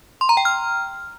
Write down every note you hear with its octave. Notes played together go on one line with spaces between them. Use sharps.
C6
A#5
G5
F6